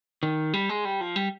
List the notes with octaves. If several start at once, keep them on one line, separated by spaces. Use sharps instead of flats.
D#3
G3
G#3
G3
F3
G3